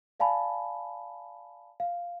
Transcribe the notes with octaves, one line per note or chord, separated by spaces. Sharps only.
D5 F5 G#5 A5 B5
F5